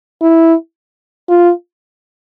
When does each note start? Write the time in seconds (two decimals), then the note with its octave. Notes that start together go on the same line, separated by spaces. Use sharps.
0.22 E4
1.29 F4